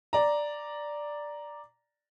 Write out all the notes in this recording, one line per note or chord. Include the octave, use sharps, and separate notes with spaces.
D5 A#5